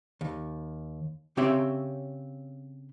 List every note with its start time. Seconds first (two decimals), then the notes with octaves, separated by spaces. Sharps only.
0.21 D#2
1.37 C#3 C4 G4 C#5 E5 C6